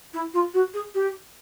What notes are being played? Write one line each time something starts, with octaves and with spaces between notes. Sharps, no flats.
E4
F4
F#4
G#4
G4